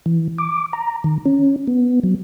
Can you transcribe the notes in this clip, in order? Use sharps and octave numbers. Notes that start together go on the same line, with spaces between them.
E3
D6
A#5
D#3
C#4
B3
F#3